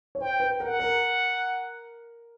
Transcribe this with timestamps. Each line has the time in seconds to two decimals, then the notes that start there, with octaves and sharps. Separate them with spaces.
0.15 C#5
0.21 C5 G5
0.40 B4
0.60 A#4 F#5
0.79 A#4